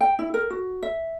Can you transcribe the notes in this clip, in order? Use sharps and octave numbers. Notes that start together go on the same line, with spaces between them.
G5
E4
A#4
F#4
E5